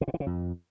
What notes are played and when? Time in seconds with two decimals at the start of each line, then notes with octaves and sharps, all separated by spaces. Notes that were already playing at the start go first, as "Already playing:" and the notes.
0.01 C3
0.08 A#2
0.14 E3
0.20 C#3
0.26 F2